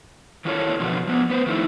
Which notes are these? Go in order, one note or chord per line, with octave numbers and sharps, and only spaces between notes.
D#3 E3 F4 A4 A#4 C#5
B2 D3 F3 F#4
F3 B3
B3 B4 C5
D#3 F3 A3 C4 D#4 E4